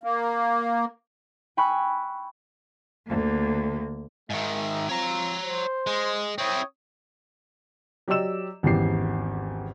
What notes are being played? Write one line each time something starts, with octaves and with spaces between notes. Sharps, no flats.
A#3
G5 G#5 B5 C#6 E6 F#6
D2 A#3
G#2 D#3 G#3 D#4 E5
C4 F4 C#5 A#5
C5
G#3
C4 E4 C#5 G5 D#6
F#3 G4 D5 D#5 E6 E7
G#1 E2 C#4 G4 C7